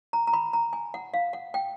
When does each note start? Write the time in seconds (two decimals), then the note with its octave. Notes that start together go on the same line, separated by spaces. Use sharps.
0.13 A#5
0.27 A#5
0.33 B5
0.53 A#5
0.73 G#5
0.94 F#5
1.14 F5
1.33 F#5
1.54 G5